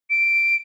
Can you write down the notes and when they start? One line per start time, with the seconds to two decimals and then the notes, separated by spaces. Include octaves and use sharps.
0.10 D7